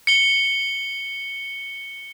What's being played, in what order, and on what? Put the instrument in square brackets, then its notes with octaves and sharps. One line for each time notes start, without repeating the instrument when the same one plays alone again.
[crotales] C#7 G7